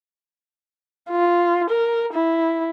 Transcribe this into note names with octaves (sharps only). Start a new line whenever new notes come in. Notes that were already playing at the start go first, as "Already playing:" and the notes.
F4
A#4
E4